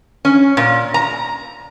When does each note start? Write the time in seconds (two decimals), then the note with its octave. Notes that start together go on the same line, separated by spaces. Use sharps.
0.25 C#4
0.57 A#2
0.94 A#5